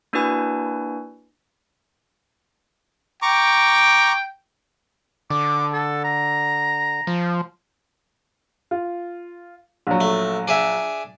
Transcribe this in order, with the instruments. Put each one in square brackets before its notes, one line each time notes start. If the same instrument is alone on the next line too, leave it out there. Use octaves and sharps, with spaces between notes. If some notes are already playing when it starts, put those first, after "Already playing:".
[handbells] A#3 D4 E4 F#4 B4 G#5
[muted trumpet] G5 [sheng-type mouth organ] A#5 C#6 D6
[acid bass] D3 [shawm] D6
[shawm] A4
A#5
[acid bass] F3
[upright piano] F4
A#1 F#3
[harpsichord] A3
D4 G#4 E5